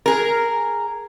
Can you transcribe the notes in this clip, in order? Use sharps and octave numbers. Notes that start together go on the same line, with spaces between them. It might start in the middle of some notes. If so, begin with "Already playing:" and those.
G#4 A#4